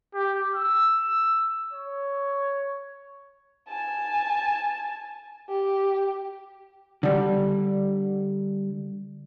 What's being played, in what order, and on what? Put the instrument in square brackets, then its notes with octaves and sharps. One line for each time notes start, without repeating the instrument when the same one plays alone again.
[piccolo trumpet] G4
E6
C#5
[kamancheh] G#5 A5
G4
[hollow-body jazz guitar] D3 G3